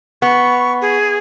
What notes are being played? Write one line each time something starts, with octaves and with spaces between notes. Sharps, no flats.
B3 C#6
G#4